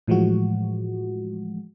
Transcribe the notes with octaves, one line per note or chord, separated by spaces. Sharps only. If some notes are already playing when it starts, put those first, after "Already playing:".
A2 E3 F3 G#3 F#4